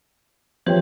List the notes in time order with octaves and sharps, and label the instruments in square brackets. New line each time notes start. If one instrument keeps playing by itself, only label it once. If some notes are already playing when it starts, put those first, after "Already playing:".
[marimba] E3 G4 B4 [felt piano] F3 C#5 G5